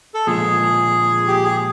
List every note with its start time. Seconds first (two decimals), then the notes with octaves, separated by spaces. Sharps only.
0.14 A4
0.27 A#2 F3 G#3 G#4
1.27 G4
1.43 G#4